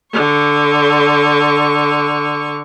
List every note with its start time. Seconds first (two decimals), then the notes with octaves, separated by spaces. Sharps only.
0.14 D3 C#6